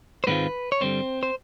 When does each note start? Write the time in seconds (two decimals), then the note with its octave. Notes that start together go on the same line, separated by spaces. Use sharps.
0.24 C5
0.27 G#2 D#3 G#3 B3 C4 F4 B4
0.72 C#5
0.81 G2 D3 G3 C4 C5
1.23 C5